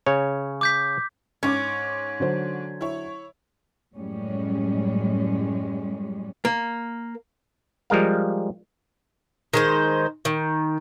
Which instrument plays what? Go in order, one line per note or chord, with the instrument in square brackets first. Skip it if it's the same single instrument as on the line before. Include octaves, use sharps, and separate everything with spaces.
[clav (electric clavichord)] C#3 C#5
[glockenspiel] D6 G6 B6
[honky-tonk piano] G#2 C#5 D6 [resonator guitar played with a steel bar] C#4
[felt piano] D3 F#3 C5
[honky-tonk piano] E4 C#5
[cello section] F#2 A2 G3 G#3 C#4
[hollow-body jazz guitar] A#3
[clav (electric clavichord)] F3 G3 G#3 A#4 F5
[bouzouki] D#3 G#3 C5
D#3